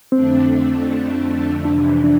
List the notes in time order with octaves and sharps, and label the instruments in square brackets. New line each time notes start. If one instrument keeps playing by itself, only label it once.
[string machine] F2 D3 A3 D4 [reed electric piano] C4
[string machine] F2 C3 E3 [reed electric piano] D4
[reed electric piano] D4